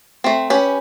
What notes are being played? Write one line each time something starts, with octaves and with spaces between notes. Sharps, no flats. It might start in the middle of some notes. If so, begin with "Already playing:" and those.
A3 C4
C#4 G4 B4